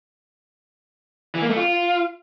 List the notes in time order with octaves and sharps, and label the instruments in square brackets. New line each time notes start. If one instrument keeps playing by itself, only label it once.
[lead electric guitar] E3
A#3
A3
F4